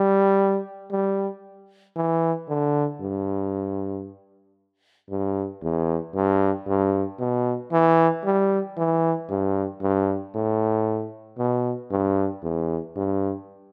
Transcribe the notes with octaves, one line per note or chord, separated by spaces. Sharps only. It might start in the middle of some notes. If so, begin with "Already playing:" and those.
Already playing: G3
G3
E3
D3
G2
G2
E2
G2
G2
B2
E3
G3
E3
G2
G2
A2
B2
G2
E2
G2